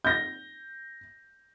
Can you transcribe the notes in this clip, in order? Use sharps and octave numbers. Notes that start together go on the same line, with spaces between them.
G6 A#6